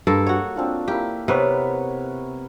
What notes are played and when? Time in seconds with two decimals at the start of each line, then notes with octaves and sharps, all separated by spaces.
0.07 G2 A#3 A4
0.27 F#4 C#5 F#5
0.56 C4 D4 F4
0.88 A#3 E4 G4 B4
1.28 C3 B3 A#4 B4 C#5